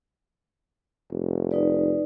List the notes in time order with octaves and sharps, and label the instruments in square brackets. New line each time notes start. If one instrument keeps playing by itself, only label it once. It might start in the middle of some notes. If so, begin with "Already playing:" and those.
[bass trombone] F1
[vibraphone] D#4 B4 D5